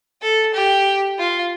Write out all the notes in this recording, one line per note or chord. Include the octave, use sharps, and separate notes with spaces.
A4
G4
F4